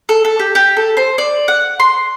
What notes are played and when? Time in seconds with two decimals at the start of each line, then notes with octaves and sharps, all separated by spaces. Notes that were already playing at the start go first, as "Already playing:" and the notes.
0.09 A4
0.25 A4
0.39 G4
0.55 G4
0.77 A4
0.97 C5
1.18 D5
1.48 F#5
1.80 C6